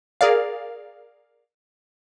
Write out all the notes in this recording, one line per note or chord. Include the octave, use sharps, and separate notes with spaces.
G#4 A#4 D5 F5